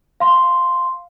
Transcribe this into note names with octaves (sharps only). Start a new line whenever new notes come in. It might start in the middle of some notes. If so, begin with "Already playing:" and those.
F5 C6